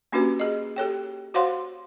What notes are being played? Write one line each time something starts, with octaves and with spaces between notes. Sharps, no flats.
A#3 C#4 D4 F#4 G4 B4
G#4 D#5
G4 A4 C#5 G5
F#4 C5 C#5 F5 F#5 C6